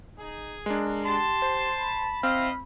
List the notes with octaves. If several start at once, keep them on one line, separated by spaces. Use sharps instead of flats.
D#4 G#4
G#3 D4 A#4
G4 A5 C6
C5
B5
C4 E4 D#5 F5